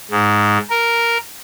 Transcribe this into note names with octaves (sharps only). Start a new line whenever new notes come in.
G#2
A#4